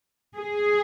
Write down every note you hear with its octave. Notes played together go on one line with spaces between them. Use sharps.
G#4